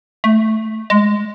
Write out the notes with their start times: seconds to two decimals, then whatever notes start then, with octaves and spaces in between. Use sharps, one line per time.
0.24 A3
0.90 G#3